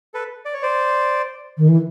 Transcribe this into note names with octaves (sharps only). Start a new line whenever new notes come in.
A4 B4
D5
C#5
C5 D5
D#3
E3